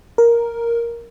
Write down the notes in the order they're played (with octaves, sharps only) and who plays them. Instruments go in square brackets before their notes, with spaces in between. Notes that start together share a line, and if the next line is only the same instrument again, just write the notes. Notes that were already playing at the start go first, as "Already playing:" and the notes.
[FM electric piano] A#4